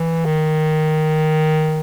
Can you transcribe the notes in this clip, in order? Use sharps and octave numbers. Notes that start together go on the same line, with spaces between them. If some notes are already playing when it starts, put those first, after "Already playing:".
Already playing: E3
D#3